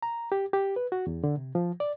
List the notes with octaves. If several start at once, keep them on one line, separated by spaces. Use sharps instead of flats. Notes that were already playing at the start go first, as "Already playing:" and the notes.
A#5
G4
G4
B4
F#4
E2
D3
C3
F3
D5